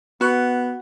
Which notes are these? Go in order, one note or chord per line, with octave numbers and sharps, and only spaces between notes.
B3 F#4